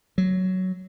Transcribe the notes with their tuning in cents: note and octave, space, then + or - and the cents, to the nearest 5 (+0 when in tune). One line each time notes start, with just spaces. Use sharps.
F#3 +10